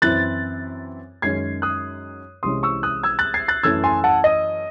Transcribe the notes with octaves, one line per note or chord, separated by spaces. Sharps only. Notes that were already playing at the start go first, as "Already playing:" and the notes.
F#2 E3 C4 E4 F#6 A6
F#2 D#3 G#3 C#4 G#6 C7
D#6 F#6
C2 C3 E3 G#3 C#4 C6 D#6
C#6 E6
D#6 F#6
E6 G#6
F#6 A6
G#6 C7
F#6 A6
F#2 E3 A3 C#4 E6 G#6
G#5 C6
F#5 A5
D#5